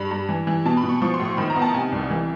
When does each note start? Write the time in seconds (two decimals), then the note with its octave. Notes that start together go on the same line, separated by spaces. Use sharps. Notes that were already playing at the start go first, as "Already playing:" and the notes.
Already playing: G2 B5
0.11 G2
0.29 E3
0.47 E3
0.65 B2 A5
0.77 B5
0.83 B2
0.89 C#6
1.02 F3 C#6
1.14 C6
1.19 A2
1.25 C#6
1.37 D#3 B5
1.50 A#5
1.56 B3
1.62 A5
1.74 C3 G#5
1.92 C2
2.11 E3